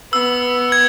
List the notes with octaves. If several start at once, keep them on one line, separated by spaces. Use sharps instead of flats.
B3 E6
G#6